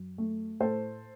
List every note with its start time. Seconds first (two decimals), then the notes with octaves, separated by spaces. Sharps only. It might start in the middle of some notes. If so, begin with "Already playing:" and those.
Already playing: F#2
0.18 A3
0.60 A2 A4 C5